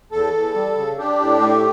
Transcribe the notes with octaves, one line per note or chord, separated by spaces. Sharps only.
E2 A4
E2
G3
C#3
D4 G4
A2
A3